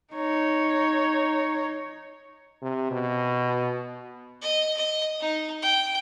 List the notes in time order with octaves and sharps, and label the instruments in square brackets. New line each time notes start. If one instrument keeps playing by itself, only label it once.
[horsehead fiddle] D#4 C#5
[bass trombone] C3
B2
[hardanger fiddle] D#5
D#5
D#4
G5